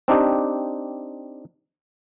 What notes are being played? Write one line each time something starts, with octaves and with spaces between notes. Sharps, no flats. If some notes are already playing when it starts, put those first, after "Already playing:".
C4 D4 D#4 G4